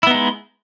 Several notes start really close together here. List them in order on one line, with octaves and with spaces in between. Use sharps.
E4 B3 D#4 G#3